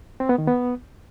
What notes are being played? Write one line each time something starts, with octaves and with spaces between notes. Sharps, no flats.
C4
B3
D#3
B3